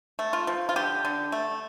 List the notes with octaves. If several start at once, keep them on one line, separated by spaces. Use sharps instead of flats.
A3
F4
F3
F4
D3 G4
D3
A3